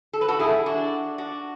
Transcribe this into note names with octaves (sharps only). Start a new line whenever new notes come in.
A4
B4
F#4 A4
E4 G#4
D4 F#4
D4 F#4